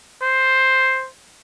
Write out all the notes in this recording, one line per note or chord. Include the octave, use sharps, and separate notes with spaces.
C5